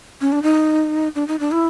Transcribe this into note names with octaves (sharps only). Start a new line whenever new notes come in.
C#4
D4
D#4
D4
D#4
D4
E4